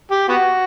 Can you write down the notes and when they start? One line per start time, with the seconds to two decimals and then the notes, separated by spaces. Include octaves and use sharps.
0.11 G4
0.29 B3 F#4